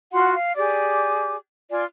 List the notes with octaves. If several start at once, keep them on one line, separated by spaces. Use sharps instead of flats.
F4 F#4 F#5 C6
F5
G4 G#4 D5 D6
F4 D5 G#5